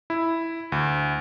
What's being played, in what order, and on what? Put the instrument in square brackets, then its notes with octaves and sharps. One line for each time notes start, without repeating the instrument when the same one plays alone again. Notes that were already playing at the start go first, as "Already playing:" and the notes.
[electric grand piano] E4
D2